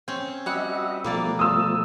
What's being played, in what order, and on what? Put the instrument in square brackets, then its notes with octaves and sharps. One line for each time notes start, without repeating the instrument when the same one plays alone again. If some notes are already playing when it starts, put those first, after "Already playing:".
[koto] C4 C#4
[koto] G3 F#5 [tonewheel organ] F#4 D#5 E5
[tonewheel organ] B2 F3 A3 [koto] G3 A#3 D5
[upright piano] D#6 E6